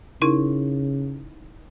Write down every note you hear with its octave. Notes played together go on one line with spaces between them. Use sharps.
C#3 D#4 E4 A#4